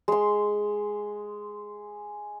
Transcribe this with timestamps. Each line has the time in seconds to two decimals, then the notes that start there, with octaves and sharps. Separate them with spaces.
0.08 G#3 C6